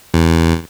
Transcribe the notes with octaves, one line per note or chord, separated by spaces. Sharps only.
E2